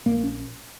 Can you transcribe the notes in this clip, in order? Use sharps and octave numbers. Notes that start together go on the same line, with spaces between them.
A#1 A#3
C#4